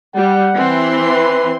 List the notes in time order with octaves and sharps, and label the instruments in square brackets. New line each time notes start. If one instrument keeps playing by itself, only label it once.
[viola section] G3 [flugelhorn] F#5
[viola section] E3 C4 C6
[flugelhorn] B4